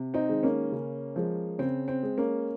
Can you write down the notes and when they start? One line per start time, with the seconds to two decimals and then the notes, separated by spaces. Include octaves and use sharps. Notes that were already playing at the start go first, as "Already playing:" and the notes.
Already playing: C3
0.14 C4 D#4
0.29 D#3 G#3
0.43 A#3 C#4
0.72 C#3
1.16 F3 G#3
1.59 C#3 C4
1.88 C4
2.03 G#3
2.17 A#3 C#4